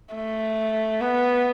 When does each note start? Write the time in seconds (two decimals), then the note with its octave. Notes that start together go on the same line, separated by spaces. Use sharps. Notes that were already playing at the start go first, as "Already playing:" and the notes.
0.14 A3
1.01 B3